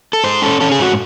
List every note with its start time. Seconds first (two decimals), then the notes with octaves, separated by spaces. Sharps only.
0.13 A4
0.24 G#2 C5
0.42 C#4 A4
0.61 C#4 A4
0.72 G#4
0.79 G#2 F#4